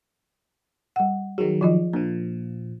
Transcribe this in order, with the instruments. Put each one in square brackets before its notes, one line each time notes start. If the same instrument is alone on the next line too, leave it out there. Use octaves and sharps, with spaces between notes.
[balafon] G3 F#5
[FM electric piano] D#3 F#3 [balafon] G#4
[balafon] F3 F4 D#5
[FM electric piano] A#2 F3 [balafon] D4